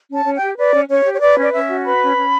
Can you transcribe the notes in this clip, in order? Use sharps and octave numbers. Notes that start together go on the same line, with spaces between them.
C#4
A5
C#4
G5
G4
B4 D5
C#4
C#4 C#5
G4
C#5
B4 D5
C#4 D5
C#4 E5
F#4
B4 B5
C#4
C#4